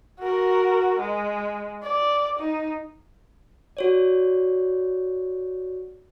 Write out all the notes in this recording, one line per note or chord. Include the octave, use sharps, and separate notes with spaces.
F#4 A#4
G#3
D5
D#4
F#4 C#5 D5